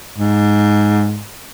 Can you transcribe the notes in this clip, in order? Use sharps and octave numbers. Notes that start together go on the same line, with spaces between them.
G#2